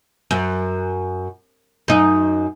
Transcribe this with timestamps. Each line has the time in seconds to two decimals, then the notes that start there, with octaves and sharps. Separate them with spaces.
0.31 F#2
1.88 F#2 D#4